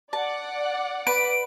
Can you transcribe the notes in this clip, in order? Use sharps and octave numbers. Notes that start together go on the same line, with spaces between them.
D5 F#5 A5
B4 D7